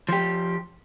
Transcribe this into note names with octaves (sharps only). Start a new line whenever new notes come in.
F3 G4